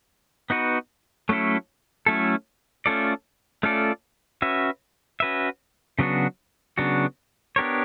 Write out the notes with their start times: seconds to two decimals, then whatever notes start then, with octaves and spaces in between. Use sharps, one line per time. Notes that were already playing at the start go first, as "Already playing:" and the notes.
0.50 B3 D#4 F#4 B4
1.29 F#3 A3 C#4 E4 A4
2.06 F#3 A3 C#4 E4 A4
2.86 A3 C#4 F4 A4 D5
3.63 A3 C#4 F4 A4 D5
4.42 C#4 F#4 B4 E5
5.20 C#4 F#4 B4 E5
5.99 C#3 F#3 B3 D4 F#4
6.78 C#3 F#3 B3 D4 F#4
7.56 B3 D4 G4 A#4 C#5